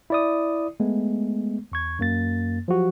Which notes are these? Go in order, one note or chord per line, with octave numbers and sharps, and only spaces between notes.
E4 D5 D#6
G#3 A3 B3
E2 C#6 G#6
F#2 A#3 A6
F3 F#3 F#4 G4